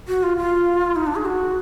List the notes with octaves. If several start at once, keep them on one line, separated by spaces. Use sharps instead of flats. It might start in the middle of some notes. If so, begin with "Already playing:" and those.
F#4
F4
F4
D#4
D4
G#4
F#4